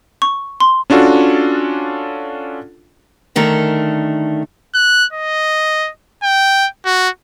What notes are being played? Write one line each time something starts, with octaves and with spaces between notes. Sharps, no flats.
C#6
C6
C#4 D4 F4 F#4 A4
D3 D#3 A3 A#4
F#6
D#5
G5
F#4